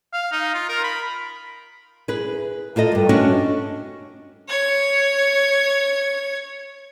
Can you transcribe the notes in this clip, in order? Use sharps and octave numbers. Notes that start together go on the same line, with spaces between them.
F5
D#4
F4
A#4
B5
G#4 B4
A#2 F4 A4 D#5
G2 G3
C#4 D4 F#4 C#5 D#5 F#5
C#5 G#6